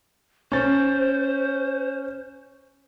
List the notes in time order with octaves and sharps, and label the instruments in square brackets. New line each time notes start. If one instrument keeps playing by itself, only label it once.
[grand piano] C#4 A6 [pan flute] C5